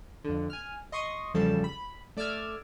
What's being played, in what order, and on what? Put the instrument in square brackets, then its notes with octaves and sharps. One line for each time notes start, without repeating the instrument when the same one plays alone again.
[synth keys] F2 D3
G#5 F6
D#5 C6 C#6 D#6
E2 C#3 F3 G3 A4 A5
B5
A3 D5 D6 E6 F6 G#6